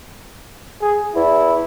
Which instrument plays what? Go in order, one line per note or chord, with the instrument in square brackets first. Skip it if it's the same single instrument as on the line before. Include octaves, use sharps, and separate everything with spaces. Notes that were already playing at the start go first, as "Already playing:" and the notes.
[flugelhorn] G#4
[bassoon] E2 [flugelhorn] E4